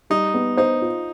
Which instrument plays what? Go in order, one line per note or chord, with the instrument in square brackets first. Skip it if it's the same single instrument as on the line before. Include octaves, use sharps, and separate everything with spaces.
[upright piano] G3 [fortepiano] D#4
[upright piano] B3
[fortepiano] D#4 [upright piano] C5
[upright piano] F4